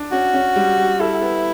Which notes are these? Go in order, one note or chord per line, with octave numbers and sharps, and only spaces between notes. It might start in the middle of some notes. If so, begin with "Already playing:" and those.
Already playing: D4
C#4 F#4
C#4
G3
G3
E4 A4
B3